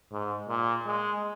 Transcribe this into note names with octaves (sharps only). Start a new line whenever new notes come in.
G#2
A#2
G#3